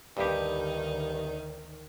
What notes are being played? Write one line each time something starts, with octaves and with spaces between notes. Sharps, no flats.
D2 G2 D#3 D#4 G4